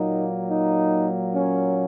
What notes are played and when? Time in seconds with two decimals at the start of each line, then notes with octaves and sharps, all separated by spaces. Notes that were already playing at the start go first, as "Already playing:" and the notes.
Already playing: A#2 F#3 A#3 D#4
0.50 D#4
1.33 C#4